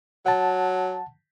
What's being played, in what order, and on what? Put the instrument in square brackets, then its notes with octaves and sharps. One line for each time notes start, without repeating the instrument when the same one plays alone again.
[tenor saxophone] F#3 [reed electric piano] F#5 A5